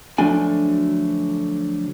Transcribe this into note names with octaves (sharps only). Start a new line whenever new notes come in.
D3 F3 F#3 A3 D4 G#5